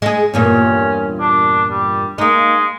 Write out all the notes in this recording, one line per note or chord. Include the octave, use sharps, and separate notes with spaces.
G#3 G#4
E2 G2 A#2 C#4
D4
G3
G#3 A#3 D#4